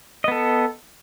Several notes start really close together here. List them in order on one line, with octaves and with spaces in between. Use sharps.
D#5 B3 A4